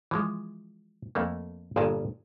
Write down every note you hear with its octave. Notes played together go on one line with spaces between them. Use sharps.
E3 F3 G#3
F2 A3 A#3
G1 G2 A#2 G#4 A#4 A5